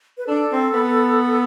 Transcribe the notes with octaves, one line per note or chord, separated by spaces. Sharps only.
B4
D4 A4
C4
B3